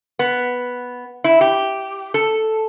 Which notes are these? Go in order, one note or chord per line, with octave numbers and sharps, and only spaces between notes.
B3
E4
G4
A4